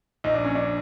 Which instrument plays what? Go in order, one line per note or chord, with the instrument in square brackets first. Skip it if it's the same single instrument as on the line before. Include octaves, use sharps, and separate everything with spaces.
[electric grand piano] A#1 [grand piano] D#4
[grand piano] D4
C#4
D4